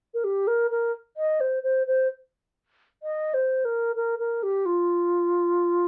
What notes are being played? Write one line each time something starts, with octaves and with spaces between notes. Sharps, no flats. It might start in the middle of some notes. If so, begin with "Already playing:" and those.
A#4
G4
A#4
A#4
D#5
C5
C5
C5
D#5
C5
A#4
A#4
A#4
G4
F4